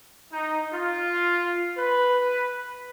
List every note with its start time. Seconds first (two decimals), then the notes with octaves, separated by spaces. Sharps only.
0.32 D#4
0.74 F4
1.78 B4